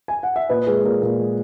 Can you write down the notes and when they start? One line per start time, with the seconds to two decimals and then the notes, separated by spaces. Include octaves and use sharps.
0.08 G#5
0.23 F#5
0.36 E5
0.49 A#2 B4 D#5
0.67 G#3 G#4 B4
0.84 A#2 A#4
1.02 A#2 A#4
1.19 G#3